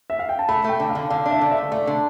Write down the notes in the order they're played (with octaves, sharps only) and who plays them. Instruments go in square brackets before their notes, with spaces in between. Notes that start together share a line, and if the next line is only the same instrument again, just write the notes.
[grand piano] E5
F5
G5
A5
[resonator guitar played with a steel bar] A3 [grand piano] B5
[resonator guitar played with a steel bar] A3 [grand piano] G5
[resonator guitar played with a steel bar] D3
[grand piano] F5
[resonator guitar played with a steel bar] D3
[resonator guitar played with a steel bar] D3 [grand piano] F5
[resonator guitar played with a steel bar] D4
[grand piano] E5
[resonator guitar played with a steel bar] D3
[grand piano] E5
[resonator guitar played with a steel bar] A3
[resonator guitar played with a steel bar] A3 [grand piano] D5
[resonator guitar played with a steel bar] D3